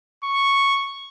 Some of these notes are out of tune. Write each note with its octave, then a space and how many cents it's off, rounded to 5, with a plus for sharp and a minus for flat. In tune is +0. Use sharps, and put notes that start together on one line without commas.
C#6 -5